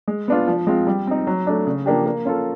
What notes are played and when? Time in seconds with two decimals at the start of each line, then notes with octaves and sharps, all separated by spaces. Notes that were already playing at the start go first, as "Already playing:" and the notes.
0.08 G#3
0.28 B3 D4 F4
0.48 F3
0.67 G#3 C4 F4
0.87 G3
1.07 C4 D#4
1.27 F#3
1.47 A3 D4
1.67 C#3
1.86 F3 A#3 D4 G4
2.06 A#3
2.25 C#4 F4 A4